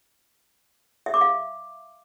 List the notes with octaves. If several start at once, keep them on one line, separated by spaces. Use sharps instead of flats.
E5
D6
F5